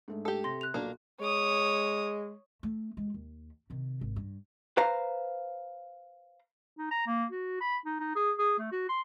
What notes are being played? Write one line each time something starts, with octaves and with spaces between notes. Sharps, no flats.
G#2 A3 D4
G4 A4
C3 C6 A#6
F#6 F7
B1 A#2 A#3 D4 F#4
G#3 C#5 D#6
A3
G#3
D#2
C3 D#3
G#1
G2
B4 C5 F5 A#5
D#4
A#5
A#3
F#4
B5
D#4
D#4
G#4
G#4
A3
F#4
C6